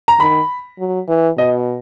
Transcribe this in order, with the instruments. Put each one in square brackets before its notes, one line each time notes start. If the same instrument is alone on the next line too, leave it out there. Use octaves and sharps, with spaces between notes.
[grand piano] A#5
[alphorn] D#3 [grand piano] B5
[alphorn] F#3
E3
[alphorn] B2 [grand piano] D#5